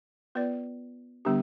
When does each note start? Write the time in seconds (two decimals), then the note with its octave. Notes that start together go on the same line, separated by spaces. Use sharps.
0.35 B3 F4 B4 D5
1.25 D3 G3 B3 D4 G4